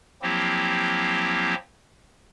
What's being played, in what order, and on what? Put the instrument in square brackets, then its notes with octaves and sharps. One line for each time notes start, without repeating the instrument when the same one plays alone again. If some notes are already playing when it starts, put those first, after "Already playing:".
[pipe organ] F3 F#3 A#3 C4 E4 G4